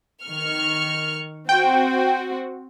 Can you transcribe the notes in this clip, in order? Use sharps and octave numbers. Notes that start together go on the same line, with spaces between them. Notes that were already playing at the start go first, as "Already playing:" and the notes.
D#3 C#6 F6
C4 F#4 G5